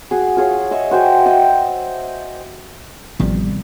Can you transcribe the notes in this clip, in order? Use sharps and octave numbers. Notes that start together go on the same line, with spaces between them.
F#4 G#4
F4 G#4 C#5
D#5 E5 C#6
F#4 C5 G5 G#5
D#5 E5 G5
A1 C3 D#3 F3 G3 B3